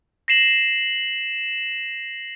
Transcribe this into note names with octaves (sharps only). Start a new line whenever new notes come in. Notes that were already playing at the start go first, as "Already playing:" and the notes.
A#6 C7 E7 F#7